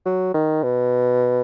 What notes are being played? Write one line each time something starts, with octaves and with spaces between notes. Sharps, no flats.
F#3
D#3
B2